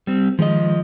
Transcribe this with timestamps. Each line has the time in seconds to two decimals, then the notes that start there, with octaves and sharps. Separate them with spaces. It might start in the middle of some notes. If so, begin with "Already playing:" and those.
0.07 G3 C4
0.39 D#3 F3 G#3 D#5